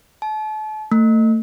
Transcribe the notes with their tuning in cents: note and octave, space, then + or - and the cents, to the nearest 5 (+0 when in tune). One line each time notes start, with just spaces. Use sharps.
A5 -35
A3 +30